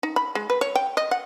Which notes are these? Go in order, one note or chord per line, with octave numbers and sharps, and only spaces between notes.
D#4
B5
G#3
B4
C#5
G5
D#5
F#5